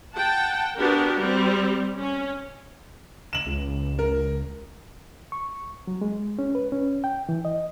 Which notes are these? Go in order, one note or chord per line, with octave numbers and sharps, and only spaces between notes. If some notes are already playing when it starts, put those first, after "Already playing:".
F#5 G5 A5
B3 D4 F#4 G4 A#4
G3 C4
C#4
E7 F#7
C#2
A#4
C#6
F#3
G#3
C#4
B4
C#4
G5
E3
D#5